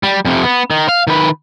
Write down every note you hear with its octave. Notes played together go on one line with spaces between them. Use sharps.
G3
F2 C3
B3
D#3
F5
D#3 B4